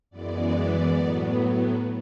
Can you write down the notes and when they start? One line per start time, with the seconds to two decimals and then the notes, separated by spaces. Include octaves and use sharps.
0.10 F#2 E3 G#3 B3 D5
0.91 A2 F#3 B3